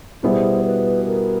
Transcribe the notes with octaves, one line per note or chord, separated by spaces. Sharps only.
B2 G3 B3 E4 G#4 C5
B4
A#4